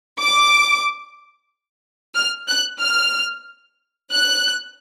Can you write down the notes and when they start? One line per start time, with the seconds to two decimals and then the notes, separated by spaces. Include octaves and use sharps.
0.19 D6
2.15 F6
2.47 F#6
2.80 F6
4.11 F#6